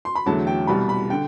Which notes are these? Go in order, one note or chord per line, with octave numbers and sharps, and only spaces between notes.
C6
B5
E2 D3 F#3 A3 A5
G5
C2 B2 G3 B5
B5
D3 G5